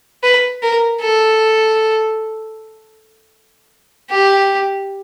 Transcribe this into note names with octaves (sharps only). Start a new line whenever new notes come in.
B4
A#4
A4
G4